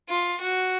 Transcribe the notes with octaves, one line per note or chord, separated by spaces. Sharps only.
F4
F#4